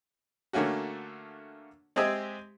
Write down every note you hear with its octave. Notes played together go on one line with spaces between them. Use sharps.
D3 A3 A#3 C#4 F#4
G#3 C4 G4 G#4 D#5 E5